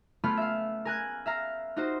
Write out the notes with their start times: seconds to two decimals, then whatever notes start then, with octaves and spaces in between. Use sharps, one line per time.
0.24 A3 B3 C#4 F4 B5 F6
0.37 E5 F5
0.85 A#4 G#5 F#6 G#6
1.26 E5 F5 A#5
1.76 D#4 F4 F#4 C5